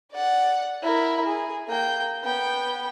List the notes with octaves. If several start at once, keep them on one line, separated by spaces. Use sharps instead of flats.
D5 F#5
E4 A#4
G#4
A#3 G5
B3 G5